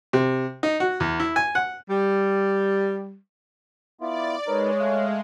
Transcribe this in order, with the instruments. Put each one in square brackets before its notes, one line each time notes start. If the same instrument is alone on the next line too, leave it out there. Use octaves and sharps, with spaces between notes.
[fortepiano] C3
D#4
F#4
E2
E4
G#5
F#5
[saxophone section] G3
[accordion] B3 E4 F4 [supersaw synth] D5
[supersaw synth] G#3 [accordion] D#4 A#4 B4 [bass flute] C#5
[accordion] A3 F5 F#6